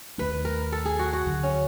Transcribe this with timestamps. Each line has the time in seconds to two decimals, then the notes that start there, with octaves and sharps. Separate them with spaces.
0.18 D#2 D#3 F#3 A3 B4
0.45 A#4
0.72 A4
0.85 G#4
0.99 F#4
1.13 F#4
1.26 D2 D3 F#3
1.43 C#4